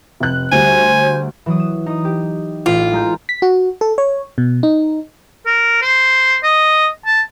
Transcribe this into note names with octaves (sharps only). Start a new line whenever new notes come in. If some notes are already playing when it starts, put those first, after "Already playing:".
F1 F#6
D2 G3 C5 G#5
E3 F#3 D#6
E7
D#4 D#6
G4
A1 F4
G#3 A#5 G6
B6
F#4
A4
C#5
B2
D#4
A#4
C5
D#5
A5